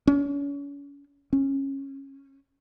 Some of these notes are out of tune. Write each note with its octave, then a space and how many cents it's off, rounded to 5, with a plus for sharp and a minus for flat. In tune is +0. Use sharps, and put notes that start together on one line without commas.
C#4 +35
C#4 -20